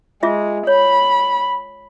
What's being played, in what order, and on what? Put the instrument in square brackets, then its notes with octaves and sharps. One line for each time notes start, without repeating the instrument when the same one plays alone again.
[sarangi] G#3 [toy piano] F4 G#4 E5
[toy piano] C#5 [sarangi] B5